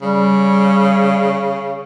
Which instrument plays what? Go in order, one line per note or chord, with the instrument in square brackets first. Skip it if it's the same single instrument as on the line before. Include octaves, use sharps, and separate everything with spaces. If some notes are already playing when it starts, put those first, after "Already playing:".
[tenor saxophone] C#3 [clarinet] G3